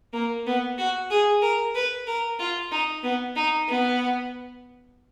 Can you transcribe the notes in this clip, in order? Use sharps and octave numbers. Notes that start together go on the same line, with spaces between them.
A#3
B3
F#4
G#4
A#4
B4
A#4
F4
D#4
B3
D#4
B3